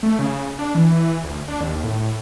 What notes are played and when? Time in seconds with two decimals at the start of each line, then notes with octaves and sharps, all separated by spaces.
0.03 A3
0.19 C#3
0.59 D4
0.75 E3
1.24 D2
1.48 D4
1.61 D#2
1.84 A2